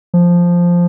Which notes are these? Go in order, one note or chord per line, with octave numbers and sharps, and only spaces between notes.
F3